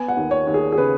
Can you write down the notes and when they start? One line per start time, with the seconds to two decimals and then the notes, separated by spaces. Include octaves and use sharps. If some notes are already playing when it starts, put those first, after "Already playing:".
Already playing: B3 G#5
0.08 F#5
0.17 D#2
0.31 C#5
0.47 D#2
0.54 G#4
0.72 G#4
0.78 C#3 B4